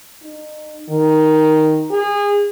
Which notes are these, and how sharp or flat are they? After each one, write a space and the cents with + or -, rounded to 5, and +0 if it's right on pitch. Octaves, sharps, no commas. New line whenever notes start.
D#4 -35
D#3 +5
G#4 -30